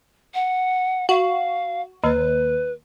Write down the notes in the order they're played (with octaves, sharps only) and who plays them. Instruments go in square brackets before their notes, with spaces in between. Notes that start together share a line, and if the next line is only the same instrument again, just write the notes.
[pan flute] F#5
[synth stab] F#4 [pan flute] F5
[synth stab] D#2 [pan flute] B4